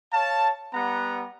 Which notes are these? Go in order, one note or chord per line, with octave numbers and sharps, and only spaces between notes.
C#5 F5 A5
G3 B3 F#5 A#5